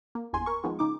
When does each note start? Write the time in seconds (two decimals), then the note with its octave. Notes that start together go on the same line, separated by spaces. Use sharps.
0.15 A#3
0.33 G1 E2 G#5 C6
0.46 A#4 C#6
0.64 D#3 F3 G#3 B3
0.79 C#3 D#4 D6